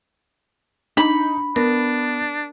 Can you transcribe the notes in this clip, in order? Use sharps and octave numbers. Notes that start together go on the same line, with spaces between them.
D4 D#4 B5
B3 D4 A#4